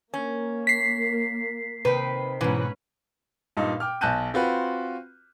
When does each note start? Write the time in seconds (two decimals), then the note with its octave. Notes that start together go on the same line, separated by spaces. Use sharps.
0.14 A#3 C#4
0.67 B6 C7
1.85 C3 D#3 B4
2.41 G#2 B2 E3 C#4 B4
3.57 G2 A#2 D#4
3.80 G5 D6 F6
4.01 B1 G#5 A5 F#6 G6 D#7
4.34 C4 F4 F#4 B4